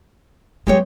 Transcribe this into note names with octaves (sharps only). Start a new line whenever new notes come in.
F#3 G#3 B3 G4 C#5